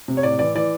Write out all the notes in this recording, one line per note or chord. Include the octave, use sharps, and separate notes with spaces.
C3
C#5
A2 D5
E3 D5
E3 D5